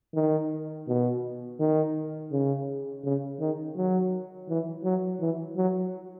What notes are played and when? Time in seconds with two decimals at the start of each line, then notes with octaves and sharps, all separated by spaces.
0.15 D#3
0.88 B2
1.60 D#3
2.32 C#3
3.04 C#3
3.40 D#3
3.76 F#3
4.49 E3
4.84 F#3
5.21 E3
5.57 F#3